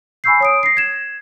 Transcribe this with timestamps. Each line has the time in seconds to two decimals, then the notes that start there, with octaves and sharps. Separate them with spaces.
0.24 G#5 B5 C#6 E6 G6 C7
0.40 C#5 D#6 D7
0.63 A#6 C7
0.77 G#6 E7